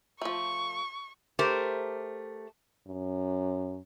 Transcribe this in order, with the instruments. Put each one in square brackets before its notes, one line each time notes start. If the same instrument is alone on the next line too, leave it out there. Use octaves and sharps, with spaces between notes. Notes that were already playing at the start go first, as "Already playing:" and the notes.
[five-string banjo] F3 A3 [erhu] C#6
[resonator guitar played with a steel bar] A3 G4 A#4 C5
[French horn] F#2